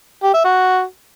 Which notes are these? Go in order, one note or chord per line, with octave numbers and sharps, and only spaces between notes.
G4
E5
F#4